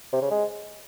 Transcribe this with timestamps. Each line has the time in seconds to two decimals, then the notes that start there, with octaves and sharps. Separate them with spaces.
0.13 C3
0.22 C#3
0.31 G#3